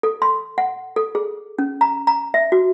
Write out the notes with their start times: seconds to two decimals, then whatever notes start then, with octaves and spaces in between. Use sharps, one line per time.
0.03 A4
0.22 C6
0.58 F#5
0.96 A4
1.15 G#4
1.59 C#4
1.81 A#5
2.07 A#5
2.34 E5
2.52 F#4